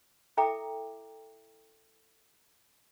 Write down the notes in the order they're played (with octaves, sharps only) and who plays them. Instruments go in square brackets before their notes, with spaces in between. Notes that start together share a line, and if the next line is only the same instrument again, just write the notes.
[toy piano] E4 A4 E5 G5 A#5 D6